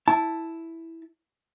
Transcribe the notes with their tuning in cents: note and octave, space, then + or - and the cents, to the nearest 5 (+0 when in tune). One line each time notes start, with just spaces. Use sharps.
E4 -5 A5 +0